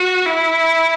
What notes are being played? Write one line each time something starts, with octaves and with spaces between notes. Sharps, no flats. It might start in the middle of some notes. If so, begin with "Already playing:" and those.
Already playing: F#4
E4